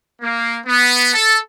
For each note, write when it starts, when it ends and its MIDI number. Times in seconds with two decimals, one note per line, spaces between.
0.21 0.58 58
0.66 1.10 59
1.13 1.37 69